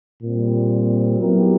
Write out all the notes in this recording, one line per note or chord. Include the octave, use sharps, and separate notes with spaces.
A#2 G3 C4
F#3 B3 E4 G4 A#4